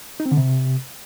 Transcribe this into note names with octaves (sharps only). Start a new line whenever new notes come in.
D#4
C4
D3
C3